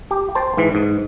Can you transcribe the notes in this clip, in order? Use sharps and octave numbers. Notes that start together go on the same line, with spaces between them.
G4
C5 G5 A5
G#2 E3
G#2